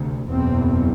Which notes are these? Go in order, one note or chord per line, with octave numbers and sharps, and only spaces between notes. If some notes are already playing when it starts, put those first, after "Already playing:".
Already playing: D2 C3
F#1 E2 B2 C4